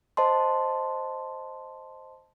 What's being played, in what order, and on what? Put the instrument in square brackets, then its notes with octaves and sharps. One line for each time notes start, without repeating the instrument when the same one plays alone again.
[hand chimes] C5 D#5 A5 C6